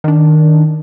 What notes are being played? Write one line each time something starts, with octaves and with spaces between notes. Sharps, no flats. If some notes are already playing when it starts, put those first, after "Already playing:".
D#3 D4